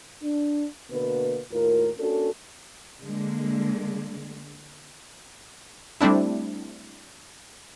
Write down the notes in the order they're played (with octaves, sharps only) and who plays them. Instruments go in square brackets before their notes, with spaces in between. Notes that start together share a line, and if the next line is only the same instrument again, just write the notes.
[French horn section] D4
B2 D3 A#3 B4
D#2 A2 F4 A#4
A#3 C#4 D4 F#4 A4
[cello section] D3 G#3 A#3
[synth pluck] G3 A3 C4 D4 E4